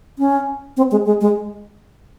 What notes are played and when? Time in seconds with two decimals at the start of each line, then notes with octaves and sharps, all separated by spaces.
0.19 C#4
0.77 C4
0.91 G#3
1.06 G#3
1.21 G#3